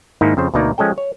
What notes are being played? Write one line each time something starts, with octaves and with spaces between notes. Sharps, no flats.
G#2 D#3 A#3 D#4 E4
F2 C#3 C5
D2 B2 A#3 D#4 D5 A#5
F3 G#3 C#4 A4 G5
C#5